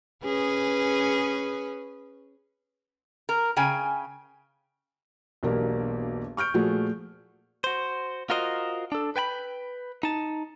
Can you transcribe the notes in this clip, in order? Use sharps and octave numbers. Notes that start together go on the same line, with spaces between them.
C#4 G#4 B4
A#4
C#3 G5 G#5
E1 B1 A#3 D4 G4 A#4
C#6 F6 G6 D7
A#2 F3 A3 F#4 G#4
F#4 C5
F4 F#4 A#4 C5 D#5
D4 A4
B4 G5 G#5 B5
D#4 A5